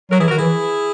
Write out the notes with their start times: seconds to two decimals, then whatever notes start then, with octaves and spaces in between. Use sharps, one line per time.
0.10 F#3 F#4 A#4
0.19 E3 E4 G#4
0.28 D#3 F#4 A#4
0.37 E3 E4 G#4